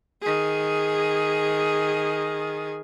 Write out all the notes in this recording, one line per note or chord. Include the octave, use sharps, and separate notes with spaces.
D#3 G#4